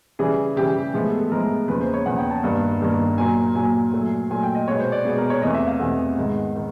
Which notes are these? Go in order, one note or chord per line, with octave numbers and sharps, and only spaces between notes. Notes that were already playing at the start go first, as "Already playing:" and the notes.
C#3 E3 G3 G#4
C#3 E3 G3 G4
A2 F3 G#3 B3 G#4
A4
A4
A2 F3 G#3 B3 A#4
E2 C#3 F3 A#3 B4
C5
C#5
E2 C#3 F3 A#3 F#5
G5
A5
G2 D#3 G3 A#3
G2 D#3 G3 A#3
A#2 F#3 A#3 G#5
A#2 F#3 A#3 G#5
A#2 F#3 A3
A#2 F#3 A3 G#5
G5
D#5
B2 G#3 B3 C#5
C5
D5
B2 G#3 B3 G#4
A#4
C#5
E2 C3 E3 A3 D#5
E5
F5
E2 C3 E3 A3 F#5
G#2 D#3 G#3 B3
D#3